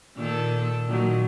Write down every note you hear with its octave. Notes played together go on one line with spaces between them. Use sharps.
A#2 D#3 A4
A#2 D#3 F#3